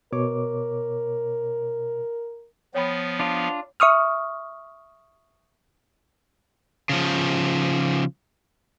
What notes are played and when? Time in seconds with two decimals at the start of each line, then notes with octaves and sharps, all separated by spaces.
0.12 B2 A#4 C#5 D6
2.74 F3 B3 C#5 G5 B5
3.19 D4 F4
3.80 E5 C#6 D#6 F6
6.89 C#3 F3